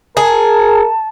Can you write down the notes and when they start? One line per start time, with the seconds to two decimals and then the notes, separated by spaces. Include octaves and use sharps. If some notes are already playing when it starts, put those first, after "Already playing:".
0.17 G#4 A#4 A5